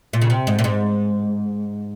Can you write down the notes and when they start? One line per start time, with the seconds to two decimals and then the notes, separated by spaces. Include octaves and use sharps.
0.13 A#2
0.22 C#3
0.30 C3
0.47 G#2
0.59 A#2
0.64 G#2